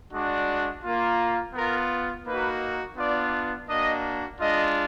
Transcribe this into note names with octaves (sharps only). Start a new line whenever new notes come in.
G#3 D4 F#4 D5
A#3 F4
B3 F4 A#4
A#3 D#4 F#4 B4
B3 D4 F4 D5
A#3 D4 F#4 D#5
G#3 D4 F4 D#5